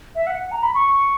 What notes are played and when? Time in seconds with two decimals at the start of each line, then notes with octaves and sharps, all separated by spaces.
0.15 E5
0.27 F#5
0.39 F#5
0.51 A#5
0.62 B5
0.75 C#6